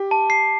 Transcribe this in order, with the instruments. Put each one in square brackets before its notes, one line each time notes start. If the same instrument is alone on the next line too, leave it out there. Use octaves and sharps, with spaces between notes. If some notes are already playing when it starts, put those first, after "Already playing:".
Already playing: [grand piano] G4
[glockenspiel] A5
C7